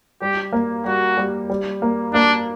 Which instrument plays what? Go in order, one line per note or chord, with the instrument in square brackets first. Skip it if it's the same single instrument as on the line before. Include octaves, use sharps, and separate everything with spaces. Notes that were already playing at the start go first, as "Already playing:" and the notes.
[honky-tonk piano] G3 [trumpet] G4
[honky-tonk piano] A#3
[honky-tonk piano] G3 [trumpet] F#4
[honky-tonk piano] G3
G3
A#3
[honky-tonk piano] A#3 [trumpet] D4